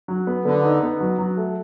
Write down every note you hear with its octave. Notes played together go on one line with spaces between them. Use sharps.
F#3
B3
D3 B3
D#4
B3
F#3
F#3
A3